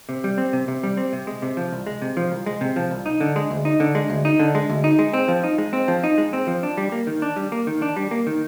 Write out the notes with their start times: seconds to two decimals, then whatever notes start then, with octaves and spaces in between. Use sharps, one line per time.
0.09 C3
0.24 G3
0.38 C4
0.53 C3
0.68 C3
0.83 G3
0.97 C4
1.13 C3
1.27 G#3
1.42 C3
1.57 F3
1.72 C2
1.87 G#3
2.02 C3
2.17 F3
2.32 C2
2.46 G#3
2.61 C3
2.76 F3
2.91 C2
3.06 D#4
3.20 D3
3.36 G#3
3.51 D2
3.65 D#4
3.80 D3
3.95 G#3
4.10 D2
4.25 D#4
4.39 D3
4.55 G#3
4.69 D2
4.84 D#4
4.99 G#3
5.13 C4
5.28 F3
5.44 D#4
5.58 G#3
5.73 C4
5.88 F3
6.04 D#4
6.18 G#3
6.33 C4
6.47 F3
6.63 D4
6.77 G3
6.92 A#3
7.07 D#3
7.22 D4
7.36 G3
7.52 A#3
7.67 D#3
7.82 D4
7.96 G3
8.11 A#3
8.27 D#3